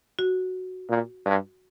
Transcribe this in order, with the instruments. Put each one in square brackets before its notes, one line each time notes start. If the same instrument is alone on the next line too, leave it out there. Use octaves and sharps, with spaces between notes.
[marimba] F#4
[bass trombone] A#2
G2